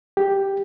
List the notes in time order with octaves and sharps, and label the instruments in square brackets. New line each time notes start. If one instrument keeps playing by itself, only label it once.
[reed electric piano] G4